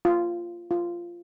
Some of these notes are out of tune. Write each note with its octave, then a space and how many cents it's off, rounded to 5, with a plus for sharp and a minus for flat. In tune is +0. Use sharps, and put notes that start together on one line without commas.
F4 -10
F4 -10